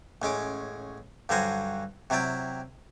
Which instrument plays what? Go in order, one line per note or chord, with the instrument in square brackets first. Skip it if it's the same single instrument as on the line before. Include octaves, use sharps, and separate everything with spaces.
[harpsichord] A1 G#3 C#4 D6
G2 D3 F#3 F#4 C5 G#5
C3 F#3 E4 D5 G5